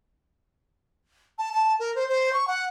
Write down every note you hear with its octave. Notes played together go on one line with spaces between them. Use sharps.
A5
A5
A#4
C5
C5
C#6
F#5